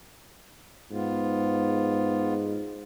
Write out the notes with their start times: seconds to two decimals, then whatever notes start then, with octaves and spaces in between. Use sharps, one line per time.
0.91 G#2 B3 F4